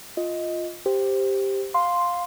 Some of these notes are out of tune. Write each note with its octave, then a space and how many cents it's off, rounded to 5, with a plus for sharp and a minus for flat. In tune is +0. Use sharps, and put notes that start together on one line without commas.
F4 +0 D#5 +10
G4 +0 C5 -5
F5 +10 C6 +0